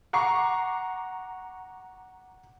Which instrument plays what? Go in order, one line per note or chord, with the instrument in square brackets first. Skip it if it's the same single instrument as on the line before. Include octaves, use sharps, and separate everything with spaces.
[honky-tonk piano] F#5 A#5 C#6 D6 C7